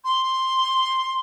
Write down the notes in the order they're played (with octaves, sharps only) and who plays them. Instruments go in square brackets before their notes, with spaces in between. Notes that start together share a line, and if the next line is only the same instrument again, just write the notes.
[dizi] C6